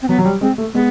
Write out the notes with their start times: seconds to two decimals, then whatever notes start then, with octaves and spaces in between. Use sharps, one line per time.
0.02 C4
0.08 F#3 B3
0.18 F#3
0.25 G3
0.41 G#3 C4
0.58 A3
0.74 G#3 B3